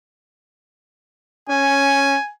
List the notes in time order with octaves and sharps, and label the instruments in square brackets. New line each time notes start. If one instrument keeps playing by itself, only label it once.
[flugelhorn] C#4 [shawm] G#5